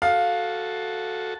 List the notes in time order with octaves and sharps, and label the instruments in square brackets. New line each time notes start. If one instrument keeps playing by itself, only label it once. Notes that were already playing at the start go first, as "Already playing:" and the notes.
[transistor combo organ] F#4 A4 [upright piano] F5